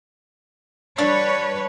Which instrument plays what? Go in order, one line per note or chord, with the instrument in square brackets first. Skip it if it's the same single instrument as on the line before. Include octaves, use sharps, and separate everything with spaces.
[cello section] G3 B4 C#5 [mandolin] D4